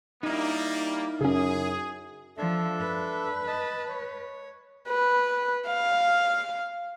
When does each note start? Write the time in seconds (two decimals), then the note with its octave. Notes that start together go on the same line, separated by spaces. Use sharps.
0.23 G3 A#3 D#4 E4
1.21 F#2 C#3 C#4 G#4
2.37 F3 D4 A4 E5
2.80 B4
3.47 D#5 A5
3.88 C#5
4.89 B4
5.67 F5